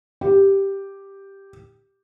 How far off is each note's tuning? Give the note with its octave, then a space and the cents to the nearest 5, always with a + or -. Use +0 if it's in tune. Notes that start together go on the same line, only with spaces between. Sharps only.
G4 +0